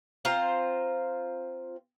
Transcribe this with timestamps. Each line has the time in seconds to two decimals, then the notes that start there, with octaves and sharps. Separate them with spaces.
0.25 C4 F4 C5 A#5